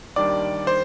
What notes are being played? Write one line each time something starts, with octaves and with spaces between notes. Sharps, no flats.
D#2 D#3 G3 D4 D5 D6
C5 C6